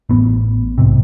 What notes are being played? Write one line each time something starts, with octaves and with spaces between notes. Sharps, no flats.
A1 B3
B1 G#2 C3